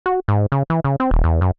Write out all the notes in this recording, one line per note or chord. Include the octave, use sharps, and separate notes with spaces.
F#4
G#2
C#3
E3
C#3
C4
D#1
E2
F#2